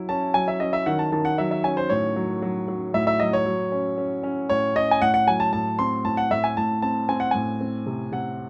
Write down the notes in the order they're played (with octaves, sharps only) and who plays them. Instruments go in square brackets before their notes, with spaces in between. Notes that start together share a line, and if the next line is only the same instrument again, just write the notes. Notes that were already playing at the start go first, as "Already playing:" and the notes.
Already playing: [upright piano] F#3 E4
[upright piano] C#4 [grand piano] A5
[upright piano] F#3 [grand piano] G#5
[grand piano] E5
[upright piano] C#4 [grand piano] D#5
[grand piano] E5
[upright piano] D#3 [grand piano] F#5
[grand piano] A5
[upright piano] D#3 [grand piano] A5
[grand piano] F#5
[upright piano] F#3 [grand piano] E5
[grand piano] E5
[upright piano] C#4 [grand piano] G#5
[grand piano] C5
[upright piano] A2 [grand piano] C#5
[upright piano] F#3
F#3
F#3
[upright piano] A2 [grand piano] E5
[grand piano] E5
[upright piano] F#3 [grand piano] D#5
[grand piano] C#5
[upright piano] F#3
C#4
C#4
C#4
[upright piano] A2 [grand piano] C#5
[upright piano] C#4 [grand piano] D#5
[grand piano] G#5
[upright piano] A2 [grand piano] F#5
[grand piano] F#5
[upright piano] F#3 [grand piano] G#5
[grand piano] A5
[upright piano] A2 [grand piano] A5
[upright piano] C4 [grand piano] C6
[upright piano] A2 [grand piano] A5
[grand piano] F#5
[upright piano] A2 [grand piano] E5
[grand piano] G#5
[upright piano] A2 [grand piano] A5
[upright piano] C4 [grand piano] A5
[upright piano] C4 [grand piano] G#5
[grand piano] F#5
[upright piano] A2 [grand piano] G#5
[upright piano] C4
C3
[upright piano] C3 [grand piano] F#5